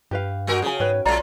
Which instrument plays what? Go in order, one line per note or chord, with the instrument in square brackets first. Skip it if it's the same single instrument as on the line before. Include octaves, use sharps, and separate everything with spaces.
[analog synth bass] G2 [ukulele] G4 B4 F5
[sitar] G3 F#4 A#4
[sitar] C#3 [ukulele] G#4 G#5
[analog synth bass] G#2 [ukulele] B4 C#5 G5
[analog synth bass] B1 [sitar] G#3 F4 [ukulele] C#5 D5 A#5